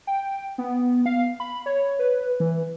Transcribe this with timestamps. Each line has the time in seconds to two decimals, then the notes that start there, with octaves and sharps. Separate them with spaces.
0.07 G5
0.58 B3
1.06 F5
1.40 B5
1.66 C#5
1.99 B4
2.40 E3